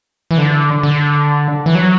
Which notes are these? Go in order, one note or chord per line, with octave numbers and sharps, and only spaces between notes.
E3
D3
D3
E3
F#3